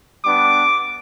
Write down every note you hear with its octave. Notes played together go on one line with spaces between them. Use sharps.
G3 B3 D4 D6